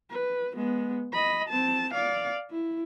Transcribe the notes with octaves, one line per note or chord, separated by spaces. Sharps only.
B4
G#3 B3
D#5 B5
C4 A5
D5 F5
E4